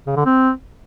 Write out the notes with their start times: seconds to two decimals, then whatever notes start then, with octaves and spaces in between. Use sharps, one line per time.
0.07 C#3
0.16 D3
0.26 C4